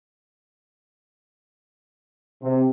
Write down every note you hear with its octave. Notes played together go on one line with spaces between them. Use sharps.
C3